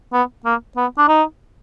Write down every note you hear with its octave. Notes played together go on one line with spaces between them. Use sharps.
B3
A#3
B3
D4
D#4